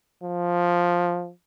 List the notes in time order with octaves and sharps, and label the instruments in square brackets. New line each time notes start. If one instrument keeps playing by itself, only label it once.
[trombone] F3